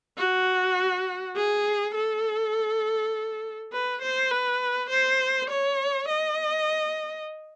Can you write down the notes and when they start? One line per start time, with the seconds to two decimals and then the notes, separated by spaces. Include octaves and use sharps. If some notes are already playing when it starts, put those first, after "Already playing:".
0.17 F#4
1.36 G#4
1.95 A4
3.72 B4
4.01 C5
4.31 B4
4.90 C5
5.49 C#5
6.08 D#5